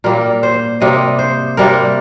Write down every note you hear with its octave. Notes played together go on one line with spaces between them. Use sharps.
A#2 G3 A#3 A#4
C5
C3 G3 A#3 D#5
C5
C3 G3 A#3 A#4